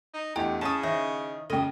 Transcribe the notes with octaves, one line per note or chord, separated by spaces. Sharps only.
D#4
E2 G2 A3 E4 G4 D#5
C#3 C#4 A5 D#6
D#3 C5 C#5 D#5 E5
C#2 C#3 A4 D#5 G5